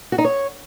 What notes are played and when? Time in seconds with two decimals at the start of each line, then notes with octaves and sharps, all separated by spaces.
0.12 F#4
0.18 D#4
0.24 C#5